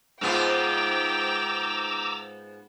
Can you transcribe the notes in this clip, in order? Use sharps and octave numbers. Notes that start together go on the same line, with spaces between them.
G#2 B3 F4 G5 A#5 D6 E6